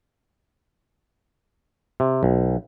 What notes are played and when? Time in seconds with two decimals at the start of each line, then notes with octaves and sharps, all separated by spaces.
2.00 C3
2.23 B1